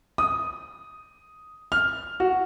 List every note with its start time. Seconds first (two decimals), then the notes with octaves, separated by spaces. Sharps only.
0.18 D#6
1.72 F6
2.20 F#4